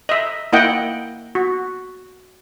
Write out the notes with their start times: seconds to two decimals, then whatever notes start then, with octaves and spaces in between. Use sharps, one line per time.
0.09 D#5 E5
0.53 A#3 E4 D#5 F#5 G5
1.35 F#4